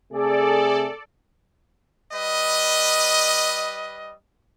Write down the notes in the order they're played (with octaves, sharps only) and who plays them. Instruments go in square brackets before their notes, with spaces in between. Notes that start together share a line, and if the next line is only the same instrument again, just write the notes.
[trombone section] C3 A3 G#4 [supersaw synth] A4 D5
[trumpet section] G3 B4 D#5